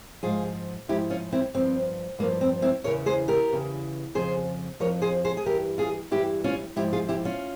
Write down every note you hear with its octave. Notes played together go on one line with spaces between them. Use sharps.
G#2 F3 F4 G#4
G#2 F3 E4 G4
C#4 F4
C4 E4
G2 F3 C4
G2 F3 A#3
C4
C4 E4
E2 C#3 E3 A#4 C#5
G#4 C5
G4 A#4
E2 C#3 E3
F2 C#3 F3 G#4 C5
F2 C#3 F3 A#4 C#5
G#4 C5
G#4 C5
G#4
G2 E3 G4 A#4
F4 G#4
G2 E3 E4 G4
C#4 F4
G#2 F3 E4 G4
F4 G#4
E4 G4
C#4 F4